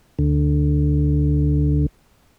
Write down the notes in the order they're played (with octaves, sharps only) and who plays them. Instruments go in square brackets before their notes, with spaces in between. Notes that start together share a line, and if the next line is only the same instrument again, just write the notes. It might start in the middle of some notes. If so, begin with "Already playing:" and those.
[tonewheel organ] D2 D3